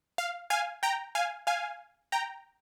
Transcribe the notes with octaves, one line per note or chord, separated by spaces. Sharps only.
F5
F5 G#5
G5 A#5
F5 G#5
F5 G#5
G5 A#5